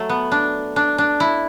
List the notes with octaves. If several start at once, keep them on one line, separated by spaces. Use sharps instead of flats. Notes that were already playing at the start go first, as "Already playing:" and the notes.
Already playing: F#3 A3
B3
D4
D4
D4
E4